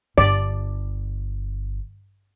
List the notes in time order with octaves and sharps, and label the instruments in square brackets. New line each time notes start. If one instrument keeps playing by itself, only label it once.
[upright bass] G1 [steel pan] D5